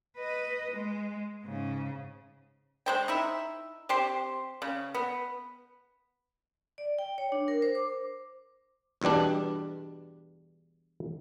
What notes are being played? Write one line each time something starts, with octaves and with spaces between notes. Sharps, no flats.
B4 D#5
G#3
G#2 C#3
G#3 C5 G5
D#4 E4 E5
C4 G4 C5 C6
C#3
B3
D5
G5
C#5
D4
A#4
C5
D6
E2 G2 B2 G3 D4